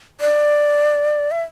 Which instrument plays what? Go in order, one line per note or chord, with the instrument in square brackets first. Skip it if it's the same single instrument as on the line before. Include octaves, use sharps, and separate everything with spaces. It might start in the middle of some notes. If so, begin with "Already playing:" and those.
[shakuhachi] D5
E5